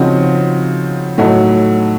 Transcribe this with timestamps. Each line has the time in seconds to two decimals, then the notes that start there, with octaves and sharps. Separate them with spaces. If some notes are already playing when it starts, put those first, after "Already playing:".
Already playing: C#3 F3 C4 D#4 F#4
1.18 A2 F#3 A3 D#4 F#4